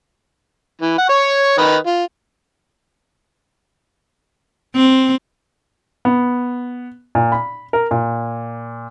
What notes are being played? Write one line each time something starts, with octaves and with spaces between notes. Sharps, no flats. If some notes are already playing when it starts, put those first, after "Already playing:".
E3
F#5
C#5 C#6
D#3 B4 D#5
F4
C4
B3
A#2
B5
A#4
A#2